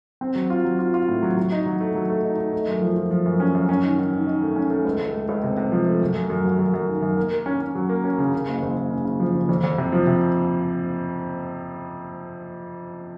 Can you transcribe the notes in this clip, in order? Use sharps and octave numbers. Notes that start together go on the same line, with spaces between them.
C4
F#3
F4
F#3
F4
F4
A2
F#3
F#3
D#4
F#3
A3
F#3
A3
D#4
D#4
A3
F#2
F3
F3
F3
F#2
C#4
F#2
C#4
D#3
D#3
D#3
D#3
A3
C#4
A3
C#2
C#2
A3
C#2
C3
C3
F3
A3
F#2
F#2
F#2
F#3
F#2
F#2
D#3
F#2
A#3
A#3
C#4
C#4
F#3
A#3
C#4
C#3
C#3
F#1
F#1
F#1
C#3
C#3
F3
C#3
F2
F2
C3
F3
C3